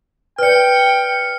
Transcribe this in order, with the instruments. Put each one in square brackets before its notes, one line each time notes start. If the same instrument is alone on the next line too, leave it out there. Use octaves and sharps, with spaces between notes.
[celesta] B4 D5 [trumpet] G5 [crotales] F6 C#7